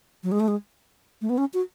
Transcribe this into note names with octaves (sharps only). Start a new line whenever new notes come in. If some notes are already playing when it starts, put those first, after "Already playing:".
F#3
G#3
A3
G#3
A3
B3
C#4
F#4